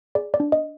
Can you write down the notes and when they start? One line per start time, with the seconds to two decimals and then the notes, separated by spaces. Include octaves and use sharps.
0.15 G#4 D5
0.34 D5
0.40 D4
0.52 D#5